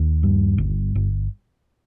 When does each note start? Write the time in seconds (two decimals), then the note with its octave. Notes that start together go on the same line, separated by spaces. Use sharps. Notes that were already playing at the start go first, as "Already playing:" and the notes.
Already playing: D#2
0.23 G2
0.58 G1
0.95 G1